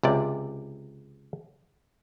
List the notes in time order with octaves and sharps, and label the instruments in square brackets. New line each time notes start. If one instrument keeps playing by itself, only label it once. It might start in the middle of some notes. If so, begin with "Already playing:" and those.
[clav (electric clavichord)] C#2 C3 D5